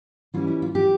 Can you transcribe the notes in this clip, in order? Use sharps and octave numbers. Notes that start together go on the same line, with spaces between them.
E3 G3 C#4 E4 F4
E4
F4
G4